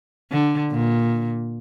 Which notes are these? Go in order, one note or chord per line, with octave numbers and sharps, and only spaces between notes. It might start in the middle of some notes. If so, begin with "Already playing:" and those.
D3
A#2